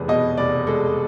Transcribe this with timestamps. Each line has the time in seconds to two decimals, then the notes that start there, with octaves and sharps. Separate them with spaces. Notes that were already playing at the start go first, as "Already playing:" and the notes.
Already playing: F1 E2 G#3 B4
0.08 B2 D#5
0.37 F1 D5
0.67 G#3 A4